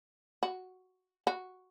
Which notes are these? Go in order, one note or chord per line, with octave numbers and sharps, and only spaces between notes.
F#4
F#4